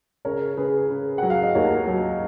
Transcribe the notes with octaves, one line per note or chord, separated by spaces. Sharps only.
C#3 A#4 C#5
C#3 G#4 B4
C#3
F#3 F#5
F5
D#5
D#2 A#4 C#5
F#3